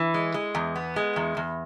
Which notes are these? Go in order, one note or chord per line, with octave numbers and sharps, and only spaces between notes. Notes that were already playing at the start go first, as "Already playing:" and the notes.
Already playing: E3
G#3
G#3
E2
B3
G#3
E2
E2